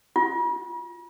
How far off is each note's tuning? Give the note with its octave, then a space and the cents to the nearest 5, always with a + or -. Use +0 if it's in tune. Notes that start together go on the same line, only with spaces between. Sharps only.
F4 -5